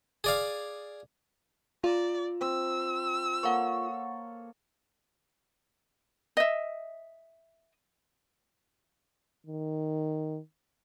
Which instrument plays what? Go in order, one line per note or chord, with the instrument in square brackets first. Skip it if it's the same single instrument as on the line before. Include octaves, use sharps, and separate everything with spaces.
[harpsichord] G#4 D5 F5
[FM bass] F4 [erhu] D5 [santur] A#5 E6
[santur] C4 [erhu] E6
[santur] A#3 A4 C#5 [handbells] F#5 C#6
[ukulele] D#5 E5
[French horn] D#3